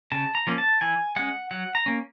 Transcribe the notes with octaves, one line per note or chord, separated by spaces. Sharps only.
C#3 A5
A#5
F3 A#3 C#4
A5
E3 G#5
G#3 C#4 F#5
F#3 F#5
A#5
A#3 C#4